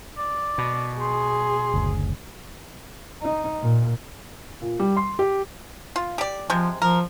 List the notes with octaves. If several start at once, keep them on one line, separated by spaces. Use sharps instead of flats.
D5
B2
G#4 C6
F#1 D2
D#4
A#2
A#2
G3
C6
G4
F4
G4 D5
C3 F3 G#3
F3 A#4